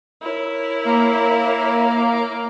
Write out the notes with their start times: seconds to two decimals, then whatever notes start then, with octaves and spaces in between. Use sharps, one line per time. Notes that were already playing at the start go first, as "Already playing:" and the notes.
0.21 E4 A#4 C#5
0.87 A#3